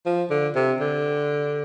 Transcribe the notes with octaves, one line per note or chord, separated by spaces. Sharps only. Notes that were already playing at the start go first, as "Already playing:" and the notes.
F3
D3
C3
D3